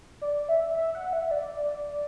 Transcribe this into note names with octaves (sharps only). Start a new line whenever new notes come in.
D5
E5
E5
F#5
E5
D5